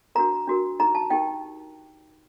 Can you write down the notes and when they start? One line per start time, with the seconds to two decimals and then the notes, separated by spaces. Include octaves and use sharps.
0.15 D4 F#4 A#4 A#5
0.47 D4 F#4 A#4
0.80 D#4 G4 A#4 A#5
0.95 A5
1.10 D#4 G4 A#4 G5